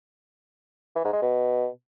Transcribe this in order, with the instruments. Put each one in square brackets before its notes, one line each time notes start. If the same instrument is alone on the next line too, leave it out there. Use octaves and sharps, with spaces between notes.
[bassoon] E3
G#2
G#3
B2